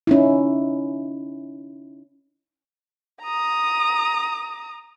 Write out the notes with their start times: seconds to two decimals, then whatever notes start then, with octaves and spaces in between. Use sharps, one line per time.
0.07 C#4 D#4 E4
3.22 A#5 D#6